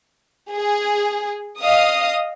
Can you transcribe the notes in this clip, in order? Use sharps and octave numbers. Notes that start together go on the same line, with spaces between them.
G#4
D#5 F5 D#6